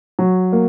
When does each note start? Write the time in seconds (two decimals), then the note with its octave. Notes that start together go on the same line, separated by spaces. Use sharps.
0.19 F#3
0.53 A#3